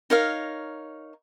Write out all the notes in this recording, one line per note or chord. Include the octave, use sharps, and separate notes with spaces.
D#4 A#4 C#5 F5